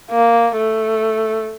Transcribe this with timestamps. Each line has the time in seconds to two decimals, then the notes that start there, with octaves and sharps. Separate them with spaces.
0.11 A#3
0.57 A3